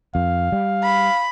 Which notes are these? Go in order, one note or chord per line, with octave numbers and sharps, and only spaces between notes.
F2 F5
G3
B5